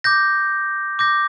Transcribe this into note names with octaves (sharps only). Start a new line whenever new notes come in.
D6 G6 A#6
D6 G6 A#6